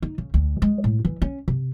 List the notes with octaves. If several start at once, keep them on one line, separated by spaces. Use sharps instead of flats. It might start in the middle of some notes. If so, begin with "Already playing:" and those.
D#4
C#3
D2
G#3
A2
E3
C#4
C3